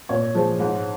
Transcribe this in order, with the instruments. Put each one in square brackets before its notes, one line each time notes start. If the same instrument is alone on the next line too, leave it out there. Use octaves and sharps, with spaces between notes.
[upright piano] A#2 C#5
F3 G#3
G#2